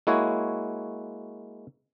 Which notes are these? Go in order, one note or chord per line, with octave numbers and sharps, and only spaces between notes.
G#3 A#3 E4 F#4 C#5 G#5